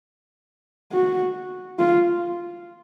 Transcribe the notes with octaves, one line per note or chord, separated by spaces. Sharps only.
F#4
F4